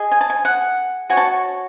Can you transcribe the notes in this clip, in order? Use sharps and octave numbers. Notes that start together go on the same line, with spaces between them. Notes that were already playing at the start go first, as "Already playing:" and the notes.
Already playing: G#4 D#5
G#5
A5
G#5
F#5
F#4 C#5 G#5 A5